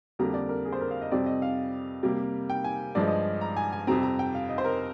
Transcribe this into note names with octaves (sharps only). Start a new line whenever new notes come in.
F2 D3 G3 A#3 A#5
D5
A#4
G#4
C5
A#4
F5
D#5
F2 C3 G3 C4 D5
D#5
F5
C3 G3 A#3
G5
G#5
G2 F3 G#3 D5
D#5
A#5
G#5
G#5
F2 C3 G3 C4 A#5
A#5
G5
F5
D#5
C5
A#4